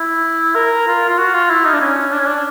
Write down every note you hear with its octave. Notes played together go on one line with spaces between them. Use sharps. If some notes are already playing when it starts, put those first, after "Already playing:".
Already playing: E4
A#4
F4
F4
F#4
F4
E4
D#4
D4
C#4
D4
C#4
D4